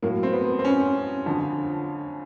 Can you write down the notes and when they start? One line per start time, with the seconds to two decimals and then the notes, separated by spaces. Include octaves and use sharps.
0.02 A2 F#3 A#3
0.23 C4
0.33 B3
0.59 C4
0.65 C#4
1.26 F2 D3 F3